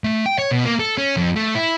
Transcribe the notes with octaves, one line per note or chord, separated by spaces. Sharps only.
A3
G5
C#5
B2
A#3
A4
C#4
F2
A3
E4